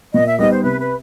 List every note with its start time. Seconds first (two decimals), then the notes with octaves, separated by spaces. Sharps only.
0.14 A#2 D#5
0.27 E5
0.39 G3 B3 D#4 D#5
0.51 C5
0.63 C3 B4
0.80 B4